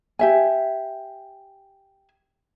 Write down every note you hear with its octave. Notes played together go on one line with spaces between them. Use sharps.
G4 E5 G#5